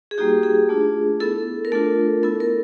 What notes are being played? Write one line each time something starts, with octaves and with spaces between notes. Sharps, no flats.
G#4
G3 A#3 D#4 F#4 G4
G#4
A3 D4 F4
B3 E4 A4
A#4
A3 D4 F4 A4
B3 E4 A4
A#4